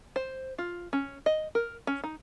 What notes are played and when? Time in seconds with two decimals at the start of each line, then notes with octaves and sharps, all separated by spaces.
0.16 C5
0.58 F4
0.93 C#4
1.26 D#5
1.55 A#4
1.87 C#4
2.04 D#4